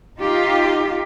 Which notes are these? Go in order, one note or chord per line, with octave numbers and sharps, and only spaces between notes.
D#4 F4 G4